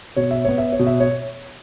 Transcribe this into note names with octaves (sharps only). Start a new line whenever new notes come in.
B2 C#5
E5
B3 C#5
E5
C#5
B2
E5
C#5